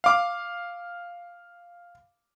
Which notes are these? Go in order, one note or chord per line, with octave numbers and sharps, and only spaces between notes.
F5 D6